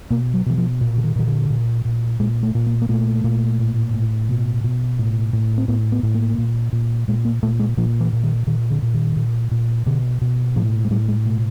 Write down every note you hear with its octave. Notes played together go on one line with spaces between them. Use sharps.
B2 A#3
F#3
B2 E3
F3
A#2
D3
D#3
A#2 D#3
D3
A#2
A#2
A#2 G#3
A3
A#2
A#3
A#3
A#2 A3
A#2
A2
A2
B2
B2
A2
A2
C4
A2 B3
B3
A2
A#3
A#2
A#2
A#2 G#3
A#3
A#2 A3
G#3
A#2 F3
E3
A#2
D#3
A#2 D#3
D3
A#2
D#3
A#2
A#2
B2 D3
B2
A2 F3
G#3
A2 G3
G#3
B2 A3